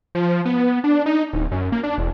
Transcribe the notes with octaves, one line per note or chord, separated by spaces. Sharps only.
F3
B3
D4
D#4
D1
F#2
A#3
D4
E1